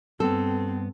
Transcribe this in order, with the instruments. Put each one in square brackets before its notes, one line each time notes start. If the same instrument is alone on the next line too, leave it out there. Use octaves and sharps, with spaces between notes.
[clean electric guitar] G2 B3 [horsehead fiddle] C4 [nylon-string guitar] A4